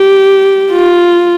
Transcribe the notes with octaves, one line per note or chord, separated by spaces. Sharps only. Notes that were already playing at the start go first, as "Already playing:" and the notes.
Already playing: G4
F4